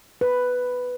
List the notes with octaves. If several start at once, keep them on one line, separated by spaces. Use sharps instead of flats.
B4